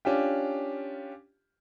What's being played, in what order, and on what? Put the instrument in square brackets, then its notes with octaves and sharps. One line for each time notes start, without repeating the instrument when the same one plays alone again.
[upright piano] C#4 D4 F4 G4